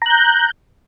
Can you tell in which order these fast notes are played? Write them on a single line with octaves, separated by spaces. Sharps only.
A#5 F#6 G6